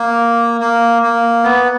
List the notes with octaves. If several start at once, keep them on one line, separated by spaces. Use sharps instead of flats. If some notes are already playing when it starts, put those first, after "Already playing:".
Already playing: A#3
A#3
A#3
B3